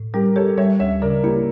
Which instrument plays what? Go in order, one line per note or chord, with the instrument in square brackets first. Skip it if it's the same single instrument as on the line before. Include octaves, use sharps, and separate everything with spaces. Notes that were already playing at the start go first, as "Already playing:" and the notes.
Already playing: [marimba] A2
[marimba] G3 [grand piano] G4 A#4
[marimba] G4 [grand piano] A4 C#5
[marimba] G3 [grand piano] C#5 E5
[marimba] D2 [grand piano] C#5 E5
[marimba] C#3 [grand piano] A#4 D5
[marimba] A#3 [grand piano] E4 G4